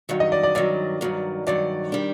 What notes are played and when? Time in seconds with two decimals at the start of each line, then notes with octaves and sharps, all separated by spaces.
0.09 G2 D#3 F#3
0.20 D#5
0.32 D5
0.43 D5
0.55 G2 D#3 F#3 D5
1.01 G2 D#3 F#3
1.47 G2 D#3 F#3 D5
1.92 D#3 G3 D4